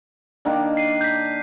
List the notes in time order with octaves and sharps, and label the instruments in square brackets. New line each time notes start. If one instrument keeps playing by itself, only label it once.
[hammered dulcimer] D#3 A#3 D4
[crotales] C7 D#7
G6 B6